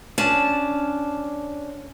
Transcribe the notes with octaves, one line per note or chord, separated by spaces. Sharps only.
C#4 D4 A5